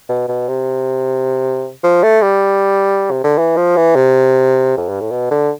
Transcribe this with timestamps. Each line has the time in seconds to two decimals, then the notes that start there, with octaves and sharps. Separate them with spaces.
0.09 B2
0.28 B2
0.48 C3
1.83 F3
2.03 A3
2.22 G3
3.11 C3
3.24 D3
3.38 E3
3.57 F3
3.77 E3
3.96 C3
4.77 F2
4.89 G2
5.01 A2
5.11 B2
5.31 D3